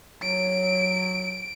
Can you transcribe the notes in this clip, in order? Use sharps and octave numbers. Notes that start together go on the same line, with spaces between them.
F#3 D7